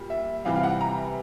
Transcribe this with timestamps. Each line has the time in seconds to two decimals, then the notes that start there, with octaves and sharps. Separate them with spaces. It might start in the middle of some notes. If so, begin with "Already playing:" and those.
Already playing: A#2 G3
0.10 E5
0.45 C3 E3 G3 F5
0.56 F5
0.63 F#5
0.81 A#5